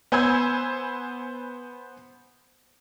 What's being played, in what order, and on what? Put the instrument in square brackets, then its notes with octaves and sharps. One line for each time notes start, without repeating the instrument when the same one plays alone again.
[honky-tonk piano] B3 C5 G#5 B5 E6 G#6